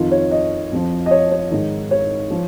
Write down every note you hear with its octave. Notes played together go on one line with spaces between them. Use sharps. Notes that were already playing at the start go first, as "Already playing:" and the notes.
Already playing: F2 D#3 F4
C#5
D#5
F2 F3
D#5
C#5
C#5
G#2 D#3
C#5
F3